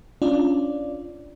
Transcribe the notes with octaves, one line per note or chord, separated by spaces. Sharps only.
C#4 D4 F4 D5